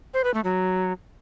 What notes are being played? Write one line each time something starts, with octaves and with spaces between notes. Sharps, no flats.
C5
B4
A3
F#3